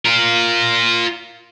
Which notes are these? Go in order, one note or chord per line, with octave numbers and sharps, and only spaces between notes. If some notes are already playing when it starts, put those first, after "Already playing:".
F4 A#4